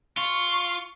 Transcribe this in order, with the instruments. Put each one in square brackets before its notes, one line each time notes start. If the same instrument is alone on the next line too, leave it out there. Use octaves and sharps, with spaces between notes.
[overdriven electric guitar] F4 [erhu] C#6